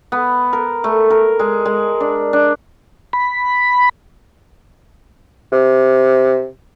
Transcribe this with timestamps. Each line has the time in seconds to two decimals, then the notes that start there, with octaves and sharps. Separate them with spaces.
0.12 B3
0.53 A#4
0.84 A3
1.10 A#4
1.39 G#3
1.65 G#3
2.00 D4
2.33 D4
3.13 B5
5.52 C3